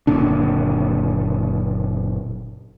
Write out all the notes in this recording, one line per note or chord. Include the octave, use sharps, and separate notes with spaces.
F#1 A#2 D3 D4